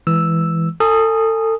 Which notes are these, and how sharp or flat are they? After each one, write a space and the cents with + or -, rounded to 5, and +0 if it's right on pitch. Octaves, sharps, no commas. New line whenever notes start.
E3 +0 G#3 +5 E6 +0
A4 +30 G#5 +0 D#6 +0